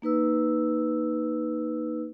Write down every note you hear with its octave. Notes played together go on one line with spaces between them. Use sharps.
A#3 D#4 B4 E6